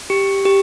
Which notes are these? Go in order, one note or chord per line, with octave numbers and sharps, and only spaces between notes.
G4
G4